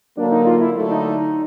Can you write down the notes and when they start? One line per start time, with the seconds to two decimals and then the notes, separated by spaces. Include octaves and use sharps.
0.17 D3 F#3 A#3 D4
0.31 D#4
0.46 F4
0.60 E4
0.76 D3 F#3 A3
0.90 D#4